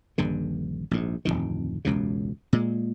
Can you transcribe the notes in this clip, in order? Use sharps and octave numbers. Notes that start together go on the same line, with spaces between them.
D#1 A#1 G2 D3
A#1 G#2
D1 A#1 F2 D#3
E1 C#2 F#2 C#3
A#2 G#3